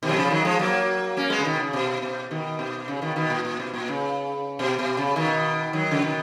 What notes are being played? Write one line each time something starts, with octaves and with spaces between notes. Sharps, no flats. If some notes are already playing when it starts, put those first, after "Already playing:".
B2 D#3
F#3
C#3 F3
D#3 F#3
F3 G#3
F#3 A#3
A#3 C#4
G#3 B3
C#3
B2 D#3
C#3
B2
B2
B2 D#3
B2
C#3
B2 D#3
B2 D#3
A#2
A#2
B2
A#2
C#3
B2
B2
C#3
B2 D#3
D#3 F#3
C#3
B2 D#3